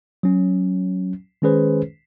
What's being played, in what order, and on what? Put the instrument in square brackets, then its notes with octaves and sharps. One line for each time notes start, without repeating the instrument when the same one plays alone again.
[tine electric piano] F#3 C#4
D#3 G#3 C#4 G#4 B4 C5